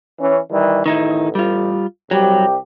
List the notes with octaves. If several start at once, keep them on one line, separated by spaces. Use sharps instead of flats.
E3 C#4
D#3 E3 G3
A1 D#3 D#4 E4
G3 F4
C2 F#3 G3 G4